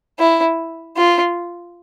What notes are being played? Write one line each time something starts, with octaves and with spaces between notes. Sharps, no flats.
E4
F4